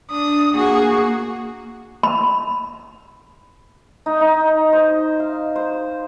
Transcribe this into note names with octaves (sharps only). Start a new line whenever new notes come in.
D4 D#6
A#3 F#4 G#4
B5
D#4
D#4
C5
F5
C5